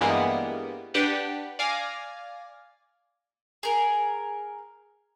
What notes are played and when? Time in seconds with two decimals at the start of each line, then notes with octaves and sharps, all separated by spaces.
0.01 G2 E3 G3 G#3 A#3 B3
0.94 D4 G4 B4 F#5
1.59 D5 F5 G#5 A#6
3.63 G#4 A#4